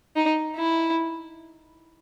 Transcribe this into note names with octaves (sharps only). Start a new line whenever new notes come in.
D#4
E4